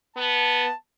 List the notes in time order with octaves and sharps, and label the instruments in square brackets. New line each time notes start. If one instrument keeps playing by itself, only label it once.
[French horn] B3 [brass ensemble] A5